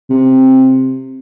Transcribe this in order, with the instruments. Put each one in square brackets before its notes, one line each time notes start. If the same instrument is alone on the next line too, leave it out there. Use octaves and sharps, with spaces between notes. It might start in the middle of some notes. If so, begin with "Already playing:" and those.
[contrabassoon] C3